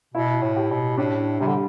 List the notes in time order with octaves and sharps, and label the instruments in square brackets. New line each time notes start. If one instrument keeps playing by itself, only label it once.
[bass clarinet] B2 [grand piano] E4
[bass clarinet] A2
[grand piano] G4
[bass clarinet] B2
[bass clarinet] A2 [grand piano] D4
[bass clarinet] C3 [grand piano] G3
[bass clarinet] D3